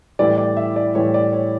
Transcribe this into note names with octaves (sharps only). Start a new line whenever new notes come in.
A2 E3 G3 D5
D5
E5
D5
A2 E3 G3 C#5
D5
C#5